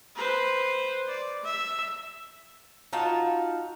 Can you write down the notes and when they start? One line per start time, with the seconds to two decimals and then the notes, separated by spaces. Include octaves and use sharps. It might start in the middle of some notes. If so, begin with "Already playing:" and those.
0.16 B4 C5
1.08 D5
1.44 E5
2.93 D#4 F4 F#4 A5